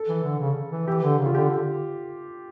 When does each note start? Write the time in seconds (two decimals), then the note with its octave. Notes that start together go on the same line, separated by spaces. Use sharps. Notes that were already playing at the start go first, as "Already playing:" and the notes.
Already playing: A4
0.08 E3
0.24 D3
0.40 C#3
0.72 E3
0.87 E3 G4
1.03 D3
1.19 C#3
1.26 F4
1.35 D3 G4
1.50 D3